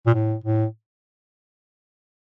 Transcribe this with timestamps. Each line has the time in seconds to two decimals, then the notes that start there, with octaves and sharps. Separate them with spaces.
0.06 A#2
0.14 A2
0.44 A2